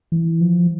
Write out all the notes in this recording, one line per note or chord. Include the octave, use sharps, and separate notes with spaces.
E3
F3